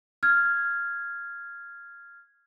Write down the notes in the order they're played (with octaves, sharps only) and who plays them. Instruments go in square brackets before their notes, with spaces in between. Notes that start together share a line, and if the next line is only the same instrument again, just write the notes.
[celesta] F6 G#6